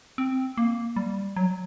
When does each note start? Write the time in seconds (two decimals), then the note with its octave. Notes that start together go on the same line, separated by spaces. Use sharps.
0.18 C4
0.58 A#3
0.96 G3
1.36 F#3